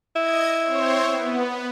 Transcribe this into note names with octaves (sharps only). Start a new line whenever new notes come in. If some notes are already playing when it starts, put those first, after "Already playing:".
E4 D#5 G#6
C4 C5 C#5
B3